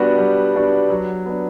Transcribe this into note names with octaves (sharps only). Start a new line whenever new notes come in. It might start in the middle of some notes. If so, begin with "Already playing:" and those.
Already playing: G3 B3 D4 F#4
G3
B3 D4 F#4
F#3
B3 D4